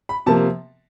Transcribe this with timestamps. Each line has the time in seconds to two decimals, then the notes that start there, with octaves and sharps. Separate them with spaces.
0.09 B5
0.26 C3 F3 A#3 A5